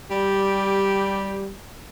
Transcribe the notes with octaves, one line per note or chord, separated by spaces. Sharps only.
G3 G4